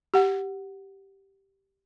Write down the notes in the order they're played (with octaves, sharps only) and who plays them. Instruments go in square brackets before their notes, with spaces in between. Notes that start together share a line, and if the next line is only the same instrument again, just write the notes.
[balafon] G4 F#5